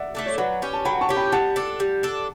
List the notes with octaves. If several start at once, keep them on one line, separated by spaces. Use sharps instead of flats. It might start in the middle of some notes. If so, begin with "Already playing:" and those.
Already playing: D5 E5 F#5
A3 D4 A4
C#5
F#3 B4 D5
C#4 G4
A5
F#3 G5 B5
A5 C#6
C#4 G4
G5 B5
G3 F#5 A5
D4 A4
G3
D4 A4